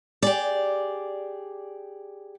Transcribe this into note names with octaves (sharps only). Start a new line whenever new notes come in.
G4 G#4 D5